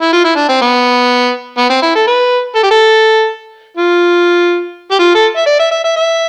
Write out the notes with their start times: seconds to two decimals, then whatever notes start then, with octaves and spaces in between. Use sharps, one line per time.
0.02 E4
0.13 F4
0.24 E4
0.36 D4
0.49 C4
0.61 B3
1.58 B3
1.70 C4
1.83 E4
1.95 A4
2.07 B4
2.55 A4
2.63 G4
2.71 A4
3.77 F4
4.91 G4
4.99 F4
5.15 A4
5.36 E5
5.47 D5
5.59 E5
5.71 E5
5.84 E5
5.96 E5